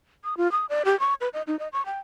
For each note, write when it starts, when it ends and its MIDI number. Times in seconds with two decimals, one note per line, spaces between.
0.24 0.37 87
0.37 0.50 65
0.52 0.66 87
0.69 0.83 74
0.85 0.98 67
1.00 1.14 85
1.21 1.29 71
1.34 1.42 75
1.47 1.59 63
1.59 1.68 75
1.73 1.84 85
1.86 1.99 79